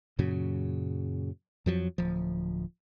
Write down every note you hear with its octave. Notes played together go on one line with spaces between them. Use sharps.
F#2 A#2 C#3 F#3
F2 F3 F#3
D1 F3